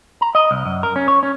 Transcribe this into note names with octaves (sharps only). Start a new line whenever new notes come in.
A#5
D#5
C2
F#2
A#4
C#4
C#5
C#4